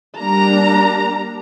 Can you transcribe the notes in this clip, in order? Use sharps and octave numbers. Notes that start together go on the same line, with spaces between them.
G3 A#3 D4 A#5